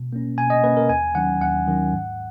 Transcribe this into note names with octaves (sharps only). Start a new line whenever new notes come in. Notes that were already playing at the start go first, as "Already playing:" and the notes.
Already playing: B2
A#3 C#4
B2 G#5
D#5
A#3 C#4 B4
A#4
D#2 G#5
D#3 F#3 C#4 F#5
D#2 F#5
D#3 F#3 C#4
G#2